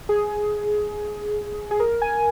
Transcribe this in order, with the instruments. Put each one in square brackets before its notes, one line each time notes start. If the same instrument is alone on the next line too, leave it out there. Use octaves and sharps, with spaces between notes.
[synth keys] G#4
G#4
A#4
G#5